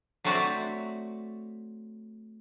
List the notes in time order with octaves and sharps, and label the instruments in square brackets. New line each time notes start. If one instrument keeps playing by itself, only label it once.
[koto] F#3 A3 C4 F#4 D5 E5